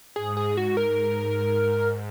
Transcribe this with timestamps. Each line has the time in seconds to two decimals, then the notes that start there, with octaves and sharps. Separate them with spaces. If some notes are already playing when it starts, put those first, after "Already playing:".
0.16 G#2 G#4
0.37 G#4
0.57 F#4
0.77 G#2 A#4